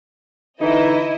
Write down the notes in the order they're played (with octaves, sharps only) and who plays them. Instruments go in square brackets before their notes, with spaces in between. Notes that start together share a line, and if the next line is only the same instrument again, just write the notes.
[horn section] D3 E3 D#4 [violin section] E4 D#5